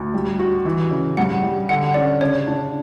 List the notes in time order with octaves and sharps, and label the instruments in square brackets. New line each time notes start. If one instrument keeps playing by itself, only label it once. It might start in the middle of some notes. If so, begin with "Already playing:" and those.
Already playing: [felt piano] D2
G3
F#4
E3
C#3
[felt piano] G2 [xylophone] F#5
[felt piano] G3
[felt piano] D3 [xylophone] F#5
[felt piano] C#4 [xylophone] D5
[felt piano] C#3 [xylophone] C#5
[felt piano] D4